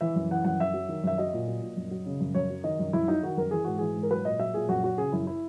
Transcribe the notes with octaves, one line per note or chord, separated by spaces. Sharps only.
E3 E5
F#2
E3 F#5
F#2 F#5
F#2 E5
F#3
D#3
F#2 E5
F#3 D#5
A#2
F#3
A#2
F#2
F#3
C#3
F#2
F#2 C#5
F#3
D#3 D#5
F#2
F#2 E4
F#3 D#4
D#3 F#4
F#2 A#4
E3 G#4
G#2 F#4
E3 G#4
G#2
A#4
F#3 B4
A#2 D#5
F#3 E5
A#2 G#4
F#2 F#4
F#3 F#4
C#3 G#4
F#2 E4
E4